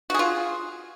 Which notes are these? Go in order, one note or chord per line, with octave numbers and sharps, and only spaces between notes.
F4 F#4 G#4